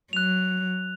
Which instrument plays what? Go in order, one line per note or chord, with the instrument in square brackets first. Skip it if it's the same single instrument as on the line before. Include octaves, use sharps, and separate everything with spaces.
[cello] F#3 [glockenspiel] F#6 F7